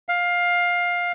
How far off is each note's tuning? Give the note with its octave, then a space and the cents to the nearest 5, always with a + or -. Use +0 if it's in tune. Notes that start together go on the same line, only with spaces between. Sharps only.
F5 +15